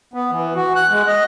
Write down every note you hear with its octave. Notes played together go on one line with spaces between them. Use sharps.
B3
E3
F#4
F#6
G#3
D#5